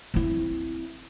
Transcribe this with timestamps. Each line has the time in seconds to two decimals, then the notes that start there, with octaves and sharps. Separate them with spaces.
0.14 C4 E4